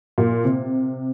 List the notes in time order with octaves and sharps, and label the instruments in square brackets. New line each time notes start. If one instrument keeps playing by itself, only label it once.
[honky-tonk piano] A#2
C3